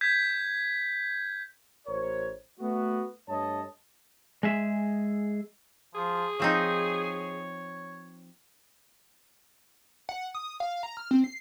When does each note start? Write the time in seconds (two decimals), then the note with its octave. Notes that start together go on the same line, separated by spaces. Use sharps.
0.01 G6 G#6 B6
1.87 A1 A#4 C5 C#5
2.60 A3 B3 F#4
3.29 G2 A3 C#5 D#5 A5
4.43 G#3 G#4 E5
5.95 F3 G#4
6.40 F3 C4 D#4 C#5
10.09 F#5
10.35 D#6
10.60 F5
10.83 A#5
10.97 F6
11.11 C4
11.24 C7